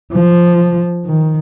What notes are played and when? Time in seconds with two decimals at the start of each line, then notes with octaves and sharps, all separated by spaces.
0.12 F3
1.06 D#3